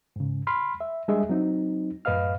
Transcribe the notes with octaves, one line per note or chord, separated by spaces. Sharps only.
G#2 C#3
B5 C6 F6
E5
G3 G#3 D4 G#4 D#5 E5
F#3 C4 D#4
F#2 A2 B4 D#5 F5 F6